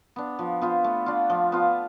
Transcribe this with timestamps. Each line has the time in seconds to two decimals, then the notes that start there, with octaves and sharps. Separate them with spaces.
0.16 B3 D4
0.39 F3
0.61 B3 F4 C5
0.84 A3
1.06 D4 F4
1.30 F3
1.52 B3 F4